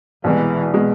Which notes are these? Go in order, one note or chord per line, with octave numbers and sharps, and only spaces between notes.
C2 B2 E3 G#3
B2 G#3